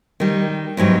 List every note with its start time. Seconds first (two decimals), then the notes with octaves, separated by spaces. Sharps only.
0.20 D#3 G3
0.77 E2 G#2 F#3 G3